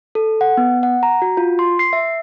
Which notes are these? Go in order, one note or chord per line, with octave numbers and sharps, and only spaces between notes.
A4
F#5
B3
F#5
A#5
F#4
F4
C6
C7
E5